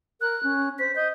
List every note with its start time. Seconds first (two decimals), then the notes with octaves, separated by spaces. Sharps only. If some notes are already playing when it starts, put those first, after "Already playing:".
0.21 A#4 F#6
0.43 C#4
0.79 C5 B6
0.96 D#5 G6